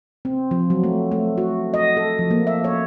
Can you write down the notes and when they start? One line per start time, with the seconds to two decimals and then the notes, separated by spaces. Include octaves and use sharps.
0.25 C4
0.51 F3
0.70 F#3
0.83 A3
1.12 A3
1.38 F#4
1.74 D#5
1.97 A4
2.19 F3
2.31 A#3
2.47 E5
2.64 C#5